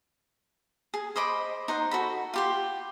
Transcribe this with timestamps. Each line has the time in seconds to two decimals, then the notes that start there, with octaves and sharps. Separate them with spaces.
0.94 G#4
1.16 C5 D#5 B5 D6
1.68 D#4 C5 F#5
1.91 F#4 A4 B5
2.34 F4 G4 C6